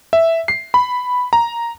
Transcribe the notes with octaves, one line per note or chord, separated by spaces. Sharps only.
E5
C7
B5
A#5